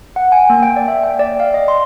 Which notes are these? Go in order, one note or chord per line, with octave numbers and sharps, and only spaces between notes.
F#5
G#5
A#3
G5
D5
E5
G5
D5
F5
D#5
C6